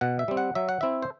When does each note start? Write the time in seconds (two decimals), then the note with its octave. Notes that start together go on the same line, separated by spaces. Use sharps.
0.01 B2 F#5
0.19 E5
0.28 G3 C4
0.37 F#5
0.55 F#3 E5
0.69 F#5
0.81 C4 E4 E5
1.02 C5